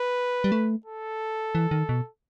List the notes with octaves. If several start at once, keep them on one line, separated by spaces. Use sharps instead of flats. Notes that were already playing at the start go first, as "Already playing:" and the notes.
Already playing: B4
G3
A3
A4
E3
D#3
B2